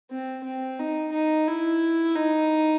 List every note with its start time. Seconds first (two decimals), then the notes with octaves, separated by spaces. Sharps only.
0.11 C4
0.44 C4
0.79 D#4
1.12 D#4
1.47 E4
2.15 D#4